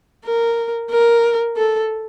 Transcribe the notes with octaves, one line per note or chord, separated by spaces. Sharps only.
A#4
A#4
A4